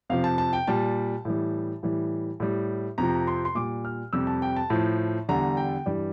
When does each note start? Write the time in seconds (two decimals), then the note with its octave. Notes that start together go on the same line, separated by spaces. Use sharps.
0.09 F2 C3 F3 F5
0.24 A5
0.38 A5
0.53 G5
0.67 A#2 G3 A5
1.25 A2 E3 G3
1.83 A2 E3 G3
2.40 A2 G3
2.98 F2 C3 F3 A#5
3.27 C6
3.45 C6
3.55 A#2 G3 D6
3.85 F6
4.13 F2 C3 G3 E6
4.27 A5
4.42 G5
4.56 A5
4.70 A2 F3
5.29 E2 D3 G3 A#5
5.57 G5
5.86 G2 E3 G3 D5